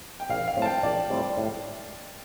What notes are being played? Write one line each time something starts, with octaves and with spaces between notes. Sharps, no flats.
G5
A#1 F5
F5
A2 G3 C4
A5
G5
A#1 D5
A2 G3 C4
A2